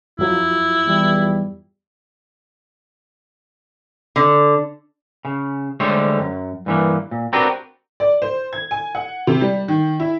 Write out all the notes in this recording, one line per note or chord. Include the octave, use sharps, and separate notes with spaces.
F2 F#3 E4 F4
E2 G3
D3
C#3
D2 D3 G3 G#3 C5 C#5
F#2
G2 E3 A#3
A#2
C4 D4 F#4 G4 A#4 B4
D5
C5
G#6
G#5
F#5
C3
G3
D#3
E4